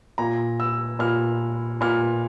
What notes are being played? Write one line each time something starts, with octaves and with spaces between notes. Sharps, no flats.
A#2 A#5
E6
A#2 F6
A#2 F6